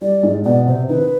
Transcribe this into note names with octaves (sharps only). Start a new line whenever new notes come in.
G3 D5
G#2 G#3
B2 B3 D5
C3 C4 C5
D#3 D#4 B4